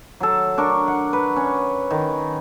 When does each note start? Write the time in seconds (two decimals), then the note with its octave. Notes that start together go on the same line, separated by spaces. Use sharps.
0.20 F#3 A4
0.58 D4 A#4 C#6
0.88 F#5
1.13 B4
1.36 C#4
1.90 D#3